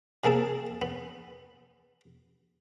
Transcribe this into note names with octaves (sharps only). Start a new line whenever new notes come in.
C3 A#3 G#4 A4 A5
B3